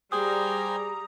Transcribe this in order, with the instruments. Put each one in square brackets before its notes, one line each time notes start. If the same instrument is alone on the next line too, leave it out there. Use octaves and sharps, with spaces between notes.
[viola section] G3 A#5 [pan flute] G#4 [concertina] C5 G5 G#5 [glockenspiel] D#6